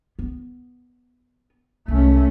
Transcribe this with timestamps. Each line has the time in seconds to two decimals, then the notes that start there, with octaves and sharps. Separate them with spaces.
0.19 B3
1.88 C2 A3 C#4